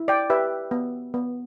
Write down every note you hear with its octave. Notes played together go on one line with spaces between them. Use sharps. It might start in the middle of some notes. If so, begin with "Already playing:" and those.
Already playing: E4
D5 G5
G4 B4 E5
B3
B3